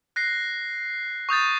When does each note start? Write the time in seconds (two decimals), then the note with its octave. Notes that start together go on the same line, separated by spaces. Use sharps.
0.16 F#6 A#6 C7
1.29 C#6 D#6 G6 A6